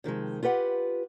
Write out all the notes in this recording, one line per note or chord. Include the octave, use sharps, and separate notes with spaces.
C3 D#3 F3 G#3
F4 G4 B4 F#5